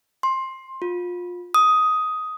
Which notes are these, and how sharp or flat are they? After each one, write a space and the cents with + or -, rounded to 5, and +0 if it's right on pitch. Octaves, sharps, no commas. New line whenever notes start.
C6 +15
F4 +25
D#6 +10